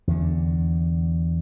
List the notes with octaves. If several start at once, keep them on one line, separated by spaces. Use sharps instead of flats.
E2 D3